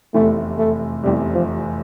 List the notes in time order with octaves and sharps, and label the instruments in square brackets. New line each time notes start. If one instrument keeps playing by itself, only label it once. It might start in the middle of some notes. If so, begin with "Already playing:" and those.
[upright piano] F1 E2 C3 [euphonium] A3
[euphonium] A3
[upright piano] F1 E2 C3 [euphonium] G3
[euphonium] F3